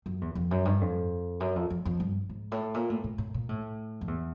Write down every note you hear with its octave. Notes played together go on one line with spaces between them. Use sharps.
F#2
E2
F2
F#2
G2
F2
F#2
F2
F2
F2
G2
G#2
A2
A#2
A2
A2
A2
A#2
A2
F2
E2